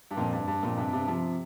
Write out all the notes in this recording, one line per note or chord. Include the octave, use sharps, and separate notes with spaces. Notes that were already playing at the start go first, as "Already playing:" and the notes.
G2
F2 A#2
G2
G2
F2 A#2
G2 C3
G2 C3
C3 F3